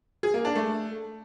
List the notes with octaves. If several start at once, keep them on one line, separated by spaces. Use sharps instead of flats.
G#4
A#3
D4
A3